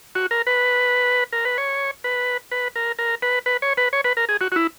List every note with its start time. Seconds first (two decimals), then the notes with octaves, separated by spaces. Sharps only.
0.15 F#4
0.31 A#4
0.47 B4
1.33 A#4
1.45 B4
1.58 C#5
2.04 B4
2.52 B4
2.76 A#4
2.99 A#4
3.22 B4
3.46 B4
3.62 C#5
3.77 B4
3.93 C#5
4.04 B4
4.17 A#4
4.29 G#4
4.41 F#4
4.52 F#4
4.56 E4